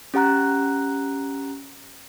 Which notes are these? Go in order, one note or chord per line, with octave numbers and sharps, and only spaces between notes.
C#4 G4 F#5 A#5 F#6